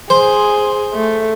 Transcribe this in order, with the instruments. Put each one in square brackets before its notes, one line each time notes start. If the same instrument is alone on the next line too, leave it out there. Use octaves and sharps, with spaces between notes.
[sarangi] G#4 [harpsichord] C5
[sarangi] A3